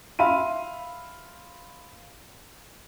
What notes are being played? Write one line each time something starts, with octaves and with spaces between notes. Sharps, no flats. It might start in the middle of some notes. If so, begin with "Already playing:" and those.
E5 F5 B5 C6 D#7